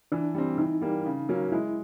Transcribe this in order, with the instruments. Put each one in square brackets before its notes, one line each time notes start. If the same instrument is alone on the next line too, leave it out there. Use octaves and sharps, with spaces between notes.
[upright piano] E3 [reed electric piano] D4
[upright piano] G3 C4
[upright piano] E3 [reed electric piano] D#4
[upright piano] G3 A#3
C#3
F#3 A#3 C#4
[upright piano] G#3 [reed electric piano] E4